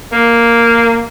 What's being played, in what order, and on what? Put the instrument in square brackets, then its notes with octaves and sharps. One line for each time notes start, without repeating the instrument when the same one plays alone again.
[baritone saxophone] A#3